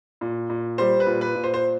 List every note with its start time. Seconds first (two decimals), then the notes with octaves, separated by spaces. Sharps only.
0.21 A#2
0.50 A#2
0.78 G3 C5
1.00 B4
1.07 A#2
1.21 B4
1.35 A#2
1.44 C5
1.54 C5